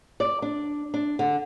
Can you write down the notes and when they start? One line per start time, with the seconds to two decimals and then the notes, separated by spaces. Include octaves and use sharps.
0.20 D5
0.42 D4
0.94 D4
1.19 D3